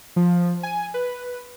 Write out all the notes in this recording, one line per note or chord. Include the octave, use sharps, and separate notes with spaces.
F3
G#5
B4